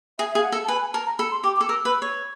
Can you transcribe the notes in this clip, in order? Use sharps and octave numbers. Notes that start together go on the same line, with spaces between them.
G#4 E5
E5
G#4
F5
F#5
A4
A5
B4 G#5
G#5
A#4 A5
A#5
A4 B5
C6
G4 D6
D6
A4
A#4 E6
B4
C#5